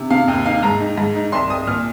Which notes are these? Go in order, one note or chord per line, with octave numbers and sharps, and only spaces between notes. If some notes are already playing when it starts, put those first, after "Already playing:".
Already playing: C3
C3 F5
D#2
D#4 F5
G#2 A#5
D#4
G#2
D#4
C2 C6
C2 D#6
A#2 F6